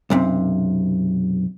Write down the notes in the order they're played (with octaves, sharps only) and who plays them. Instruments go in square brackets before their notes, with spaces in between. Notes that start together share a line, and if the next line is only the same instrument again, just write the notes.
[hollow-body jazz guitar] B1 F#2 C3